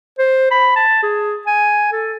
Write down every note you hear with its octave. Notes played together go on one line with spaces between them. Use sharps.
C5
B5
A5
G#4
G#5
A4